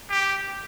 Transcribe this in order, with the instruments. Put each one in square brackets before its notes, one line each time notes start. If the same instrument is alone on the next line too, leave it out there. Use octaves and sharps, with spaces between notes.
[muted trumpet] G4